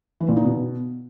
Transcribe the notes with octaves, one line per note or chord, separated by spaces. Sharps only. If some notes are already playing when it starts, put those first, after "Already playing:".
E3
A#2
D#4
B2